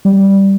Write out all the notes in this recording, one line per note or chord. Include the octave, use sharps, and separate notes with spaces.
G3